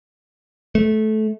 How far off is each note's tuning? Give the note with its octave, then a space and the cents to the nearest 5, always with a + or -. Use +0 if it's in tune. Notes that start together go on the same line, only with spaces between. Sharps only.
A3 -20